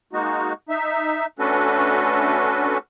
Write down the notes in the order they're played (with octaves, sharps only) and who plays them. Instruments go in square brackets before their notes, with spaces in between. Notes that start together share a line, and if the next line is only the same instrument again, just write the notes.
[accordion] G#3 A#3 D#4 F#4
D#4 E5
A3 C#4 D4 F#4 A4 B4